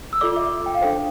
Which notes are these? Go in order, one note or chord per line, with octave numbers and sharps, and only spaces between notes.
E6
F4 A4 D5 D6
E5
G5
F5
D4 A4 C5 G5